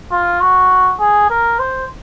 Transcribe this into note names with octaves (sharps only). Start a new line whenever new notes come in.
F4
F#4
G#4
A#4
C5